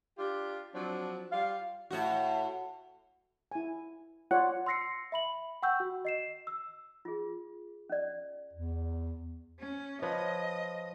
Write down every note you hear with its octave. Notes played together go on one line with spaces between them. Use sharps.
D4 F4 G4
F3 F#3 C4 D4
G3 F4 F5
A2 F#4
E4 G#5
F4 C#5 D5 F#5
C6 E6 A#6 C7 C#7
E5 B5 F#7
F#5 G5 C#6 E6 G6
F#4
D#5 C7 E7
E6
F4 G#4
C#4 D5
E2
C#4
F3 B4 C#5 D#5